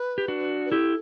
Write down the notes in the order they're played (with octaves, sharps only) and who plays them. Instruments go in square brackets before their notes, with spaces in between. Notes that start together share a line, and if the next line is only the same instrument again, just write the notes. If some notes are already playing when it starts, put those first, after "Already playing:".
Already playing: [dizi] B4
[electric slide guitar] G4
D4 F#4
[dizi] B4
[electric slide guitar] E4 G4 [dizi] A4